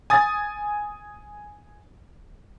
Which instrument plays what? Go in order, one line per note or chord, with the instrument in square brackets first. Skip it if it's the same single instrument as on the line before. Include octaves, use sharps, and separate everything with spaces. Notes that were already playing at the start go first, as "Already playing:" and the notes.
[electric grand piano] G#5 D#6 A6